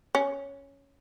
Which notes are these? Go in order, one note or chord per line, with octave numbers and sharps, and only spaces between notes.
C#4